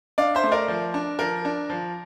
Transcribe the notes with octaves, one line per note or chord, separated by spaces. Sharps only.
D4 D5 F5
C5 E5
A3
A#4 D5
F3
D4
F3 A#4
D4
F3